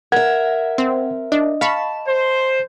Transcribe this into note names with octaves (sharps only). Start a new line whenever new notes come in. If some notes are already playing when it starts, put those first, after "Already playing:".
A#4 E5 F#5 G#6
C4
D4 D#5
F5 A5 B5 C#6
C5